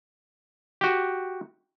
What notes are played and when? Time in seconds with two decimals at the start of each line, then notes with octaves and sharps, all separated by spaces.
0.81 F#4 G4